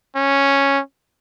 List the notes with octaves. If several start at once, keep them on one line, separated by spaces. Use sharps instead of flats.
C#4